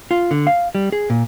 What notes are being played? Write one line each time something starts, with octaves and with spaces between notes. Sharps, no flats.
F4
D3
F5
G3
G#4
A#2